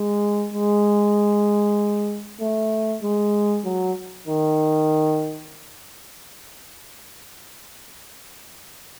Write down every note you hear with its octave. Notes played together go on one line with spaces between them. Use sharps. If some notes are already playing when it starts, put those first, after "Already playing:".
Already playing: G#3
G#3
A3
G#3
F#3
D#3